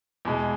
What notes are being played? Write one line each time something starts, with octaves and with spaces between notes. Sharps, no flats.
E2 B2 G#3